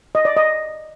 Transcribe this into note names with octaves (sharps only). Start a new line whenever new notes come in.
D#5
D5
D#5